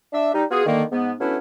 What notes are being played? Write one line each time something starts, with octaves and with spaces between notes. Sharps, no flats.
D4 E5
G3 D#4
B3 F4 F#4 G#4
D3 D#3 A#3
G#2 B3
F#3 A3 B3 C#4 D4 E4